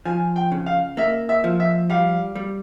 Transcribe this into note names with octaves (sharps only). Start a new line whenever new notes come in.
F3 G#5
G5
C#3
F5
A#3 E5
E5
F3
E5
G3 F5
G3